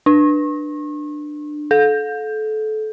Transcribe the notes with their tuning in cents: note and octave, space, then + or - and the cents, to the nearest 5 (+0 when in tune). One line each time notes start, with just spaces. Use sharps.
D4 +20
A4 -25